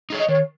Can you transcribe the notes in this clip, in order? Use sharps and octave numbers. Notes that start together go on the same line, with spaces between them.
D#4 G#4 C#5
D#5
D#3 C#5